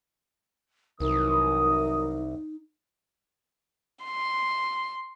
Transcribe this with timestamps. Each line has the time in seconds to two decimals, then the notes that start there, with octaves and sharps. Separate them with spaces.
1.00 C2 E3 F#3 D#4 A#4 D#6
4.04 C6